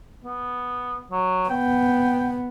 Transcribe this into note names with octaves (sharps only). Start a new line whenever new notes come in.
B3
F#3
B3 G5